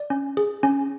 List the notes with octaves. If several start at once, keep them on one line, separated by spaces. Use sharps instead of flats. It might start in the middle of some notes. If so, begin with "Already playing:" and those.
Already playing: D5
C#4
G#4
C#4